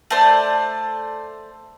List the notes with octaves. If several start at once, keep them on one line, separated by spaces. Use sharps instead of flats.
A3 C5 D5